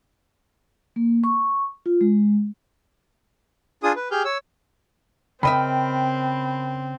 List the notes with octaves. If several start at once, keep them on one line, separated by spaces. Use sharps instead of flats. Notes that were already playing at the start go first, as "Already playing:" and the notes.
A#3
C#6
F4
G#3
D4 F4 G#4 D#6
B4
G4 G#4 F6 G6
C#5 E6
C#3 C4 A#4 D#5 E5 G5 B5 F6